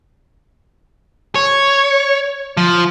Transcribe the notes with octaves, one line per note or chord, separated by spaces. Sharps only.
C#5
F3